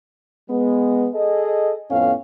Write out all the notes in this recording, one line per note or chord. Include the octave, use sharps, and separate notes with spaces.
G#3 B3
G#4 A4 D#5
F2 A2 B3 C#4 F5